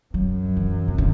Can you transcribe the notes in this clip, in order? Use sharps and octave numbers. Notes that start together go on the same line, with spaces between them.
F#2 F#3
E3
C3
D3